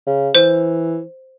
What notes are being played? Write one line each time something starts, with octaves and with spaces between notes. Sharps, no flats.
C#3
E3 C5